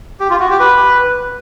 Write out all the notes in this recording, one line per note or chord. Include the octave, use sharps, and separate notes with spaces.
G4
F4
F#4
G4
B4